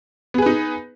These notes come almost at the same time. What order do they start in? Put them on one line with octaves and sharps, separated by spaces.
B3 G#4 B4 D#4